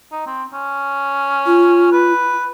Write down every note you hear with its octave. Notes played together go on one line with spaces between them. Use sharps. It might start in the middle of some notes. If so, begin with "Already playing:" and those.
D#4
C4
C#4
F4
B4